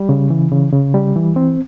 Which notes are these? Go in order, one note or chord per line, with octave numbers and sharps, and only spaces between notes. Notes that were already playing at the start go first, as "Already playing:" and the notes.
Already playing: G3
C#3
E3
C#3
C#3
G3
E3
C4